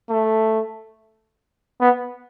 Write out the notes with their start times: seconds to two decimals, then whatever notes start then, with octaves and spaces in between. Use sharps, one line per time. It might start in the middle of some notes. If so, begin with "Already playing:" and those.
0.10 A3
1.81 B3